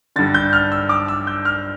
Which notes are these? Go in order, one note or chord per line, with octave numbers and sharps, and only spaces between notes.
G2 D3 A6
G6
F6
E6
D6
E6
G6
F6